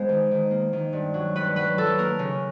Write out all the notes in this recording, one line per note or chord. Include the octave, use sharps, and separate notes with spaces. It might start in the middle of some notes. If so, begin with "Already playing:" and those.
Already playing: G#3 B3 C5
D#3
D#3
A#3
D#3
G2
F#3
G2 B4
F#3 B4
F#3 A4
A#3 A#4
C#3